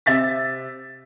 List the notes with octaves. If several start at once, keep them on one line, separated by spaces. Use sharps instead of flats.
C3 E5 A6 B6